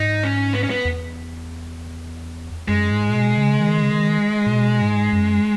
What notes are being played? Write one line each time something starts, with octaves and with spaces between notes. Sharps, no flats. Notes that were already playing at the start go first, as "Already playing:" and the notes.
Already playing: G#2 D#4
C#4
B3
C#4
B3
E2
F#2 G#3
G#2
A#2
B2
C#3
D#3
C#3
D#3
A#2
B2
G#2
F#2